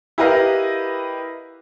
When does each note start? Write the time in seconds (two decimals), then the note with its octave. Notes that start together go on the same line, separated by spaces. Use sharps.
0.18 E4 G4 A#4 B4 D#5 F5